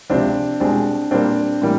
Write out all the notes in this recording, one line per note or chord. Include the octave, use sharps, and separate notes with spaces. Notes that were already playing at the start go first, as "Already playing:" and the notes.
C#2 C3 F3 C4 D4
C2 B2 G#3 C4 D4
A#2 G3 A#3 C4 D4
A2 E3 G3 A#3